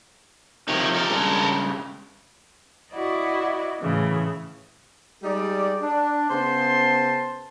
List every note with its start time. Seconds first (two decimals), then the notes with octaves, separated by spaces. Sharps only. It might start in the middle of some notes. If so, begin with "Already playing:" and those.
0.68 C3 D#3 F3 D#4 C#5
0.95 A4 A#4
1.10 G2 C#3 G#3
2.91 E4 F#4 D5 D#5
3.79 A2 C#3 E3
5.23 G3 G#3 D#4 D5
5.81 D4
6.30 C#3 B3 C5 A5 C6